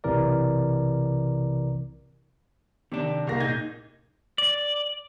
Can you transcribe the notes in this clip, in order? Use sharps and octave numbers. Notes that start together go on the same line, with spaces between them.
B1 C3 E3 A#4 D5
C3 D#3 D4
C2 A#3 A#6
A#2 D#4 G6 G#6 A#6
D5